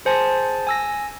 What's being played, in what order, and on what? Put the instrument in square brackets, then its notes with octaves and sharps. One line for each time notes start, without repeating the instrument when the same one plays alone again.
[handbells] G#4 C5 G#5 A5 C6 A6
G#5 E6 A#6